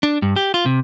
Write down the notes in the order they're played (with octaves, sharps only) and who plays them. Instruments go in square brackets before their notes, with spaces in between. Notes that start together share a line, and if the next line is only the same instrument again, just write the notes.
[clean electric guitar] D4
G2
G4
F4
C3